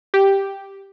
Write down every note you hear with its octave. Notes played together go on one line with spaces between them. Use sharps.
G4